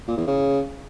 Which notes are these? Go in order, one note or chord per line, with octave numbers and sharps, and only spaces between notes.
A#2
E2
C#3